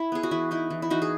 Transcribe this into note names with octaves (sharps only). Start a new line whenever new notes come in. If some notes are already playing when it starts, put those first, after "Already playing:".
Already playing: E4
B3 G#4
F#4
E3 E4
D#4 E4
E3
E4
E3 D#4 F#4
G#4